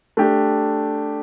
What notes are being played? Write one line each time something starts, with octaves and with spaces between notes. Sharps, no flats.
A3 D4 G4